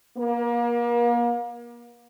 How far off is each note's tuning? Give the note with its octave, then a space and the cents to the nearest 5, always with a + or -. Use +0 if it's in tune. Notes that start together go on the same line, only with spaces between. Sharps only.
A#3 +35